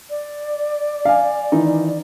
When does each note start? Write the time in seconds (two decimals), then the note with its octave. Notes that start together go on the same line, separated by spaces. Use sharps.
0.10 D5
1.05 F5 G#5
1.52 D#3 E3 D#4